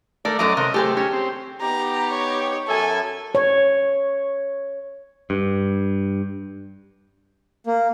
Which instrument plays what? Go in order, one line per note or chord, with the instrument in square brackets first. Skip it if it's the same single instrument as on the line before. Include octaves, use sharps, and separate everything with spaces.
[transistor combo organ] A3 A#4 [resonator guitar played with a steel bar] D5
[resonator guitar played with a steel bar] F#2 F#3 A3 [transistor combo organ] D#5 A#5 D6
[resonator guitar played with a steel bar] C3 [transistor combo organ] A#4 D#5
[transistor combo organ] A3 [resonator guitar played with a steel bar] G4 G#4 C5
[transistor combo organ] C#4 [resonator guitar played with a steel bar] G4
[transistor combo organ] C4
[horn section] B3 D#4 G4 [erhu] A#5
[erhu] C#5
[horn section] F#2 E5 G#5 [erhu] A4
[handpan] C#5
[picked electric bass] G2
[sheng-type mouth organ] A#3